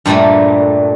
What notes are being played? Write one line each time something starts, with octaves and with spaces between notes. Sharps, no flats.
G2 A#2 G3 A3